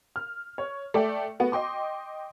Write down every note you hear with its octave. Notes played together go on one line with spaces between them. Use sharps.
F6
C#5
A3 D5 E5 G5
A3 B3 F#4
D#5 G5 C6 D6